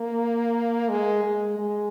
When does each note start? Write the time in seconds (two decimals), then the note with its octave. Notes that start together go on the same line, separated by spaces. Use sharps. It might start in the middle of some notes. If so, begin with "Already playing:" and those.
Already playing: A#3
0.89 G#3
1.24 G#3
1.59 G#3